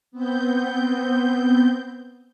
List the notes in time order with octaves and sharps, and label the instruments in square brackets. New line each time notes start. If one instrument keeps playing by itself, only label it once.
[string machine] B3 C4 G6